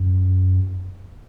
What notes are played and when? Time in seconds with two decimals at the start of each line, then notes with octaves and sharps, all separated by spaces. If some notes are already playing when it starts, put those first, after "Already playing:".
Already playing: F#2